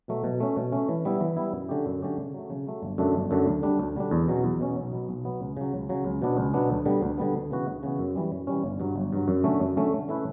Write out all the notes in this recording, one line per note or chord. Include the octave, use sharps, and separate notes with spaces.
B2 F#3 A3
B2
A3 C#4
B2
A3 C#4
E3
G3 B3 E4
E3
G3 B3 E4
F#2
D3 A3 C#4 G4
F#2
D3 A3 C#4 G4
C#3
F#3 A3
C#3
F#3 A3
G1
F#2 D3 A3 D4
G1
F#2 D3 A3 D4
D2
D3 G3 D4
D2
D3 G3 D4
E2
B2 F#3 C#4
E2
B2 F#3 C#4
B1
B2 F#3 B3
B1
B2 F#3 B3
C#2
C#3 F#3
C#2
C#3 F#3
C#2
B2 F#3 B3 D4
C#2
B2 F#3 B3 D4
D2
D3 G3 B3
D2
D3 G3 B3
D2
C#3 E3 B3 F#4
D2
C#3 E3 B3 F#4
F#2
E3 G3 C#4
F#2
E3 G3 C#4
G1
G2 F#3
G1
G2 F#3
F#2
D3 A3 C#4
F#2
D3 A3 C#4
D3
A3 C#4 E4 B4